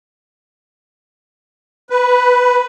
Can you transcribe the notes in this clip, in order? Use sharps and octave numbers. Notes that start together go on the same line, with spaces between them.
B4